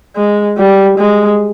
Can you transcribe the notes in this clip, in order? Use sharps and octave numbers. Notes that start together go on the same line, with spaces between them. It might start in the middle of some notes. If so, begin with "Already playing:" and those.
G#3
G3
G#3